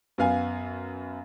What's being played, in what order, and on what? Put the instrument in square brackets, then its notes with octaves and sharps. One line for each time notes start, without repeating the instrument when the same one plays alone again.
[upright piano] F#2 B3 F5 G#5